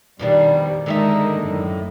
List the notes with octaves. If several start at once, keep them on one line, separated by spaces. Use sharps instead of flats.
F2 B2 D#3 G3 D4
D3 D#3 G#3 D#4 A#4 E5
F#2 A2